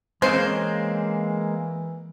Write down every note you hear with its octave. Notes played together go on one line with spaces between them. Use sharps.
C#3 E3 G#3 A#3 C4 C5